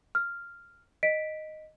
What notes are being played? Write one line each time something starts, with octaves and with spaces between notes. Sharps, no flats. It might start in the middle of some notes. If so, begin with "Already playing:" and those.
F6
D#5 B6 D7